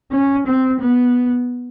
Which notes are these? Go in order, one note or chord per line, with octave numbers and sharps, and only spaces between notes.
C#4
C4
B3